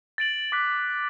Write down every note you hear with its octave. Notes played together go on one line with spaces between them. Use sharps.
A6 D7 F#7
D6 F#6 B6 F#7